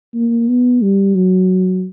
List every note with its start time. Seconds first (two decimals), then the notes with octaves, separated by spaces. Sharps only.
0.14 A#3
0.48 B3
0.82 G3
1.15 F#3